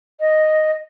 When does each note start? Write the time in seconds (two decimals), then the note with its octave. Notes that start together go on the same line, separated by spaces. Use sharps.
0.20 D#5